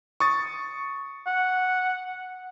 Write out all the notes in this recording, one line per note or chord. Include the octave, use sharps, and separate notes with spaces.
C#6 D#6 A6
F#5